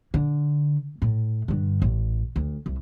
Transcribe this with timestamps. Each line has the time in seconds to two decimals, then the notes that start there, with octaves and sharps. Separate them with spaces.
0.14 D3
1.02 A2
1.48 G2 D3
1.82 A1
2.36 D2
2.66 C2